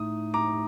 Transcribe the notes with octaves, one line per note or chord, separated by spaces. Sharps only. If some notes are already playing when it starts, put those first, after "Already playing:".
Already playing: A2 A3 D#4 D#6
A#5 D6